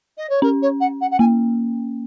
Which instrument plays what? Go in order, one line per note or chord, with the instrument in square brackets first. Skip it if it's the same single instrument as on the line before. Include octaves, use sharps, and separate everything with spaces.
[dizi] D#5
C#5
[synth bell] C#4 [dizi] A#4
[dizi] C#5
F#5
F#5
F#5
[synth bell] A#3 [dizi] G#5